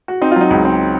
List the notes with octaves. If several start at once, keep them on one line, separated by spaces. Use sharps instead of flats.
F#4
C4 D#4
F4
F#3 D#4
C#2
C4